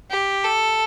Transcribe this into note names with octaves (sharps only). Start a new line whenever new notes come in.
G4
A4